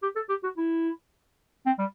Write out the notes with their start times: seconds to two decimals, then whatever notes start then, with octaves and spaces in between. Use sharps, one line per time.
0.03 G4
0.16 A4
0.29 G4
0.43 F#4
0.57 E4
1.66 C4
1.79 G3